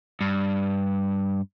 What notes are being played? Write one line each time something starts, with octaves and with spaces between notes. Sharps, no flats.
G2